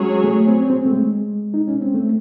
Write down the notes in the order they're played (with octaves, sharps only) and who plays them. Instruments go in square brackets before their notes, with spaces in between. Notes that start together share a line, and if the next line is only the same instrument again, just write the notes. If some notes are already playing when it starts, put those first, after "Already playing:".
Already playing: [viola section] F#3 C#4 G#4 C#5 [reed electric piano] G#3
[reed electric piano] A3
C4
C4
A3
G#3
D#4
C#4
C4
A3